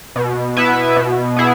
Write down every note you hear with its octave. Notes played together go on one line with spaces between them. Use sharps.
B2
B3 E4 B4 E5
B2
B3 E4 G#4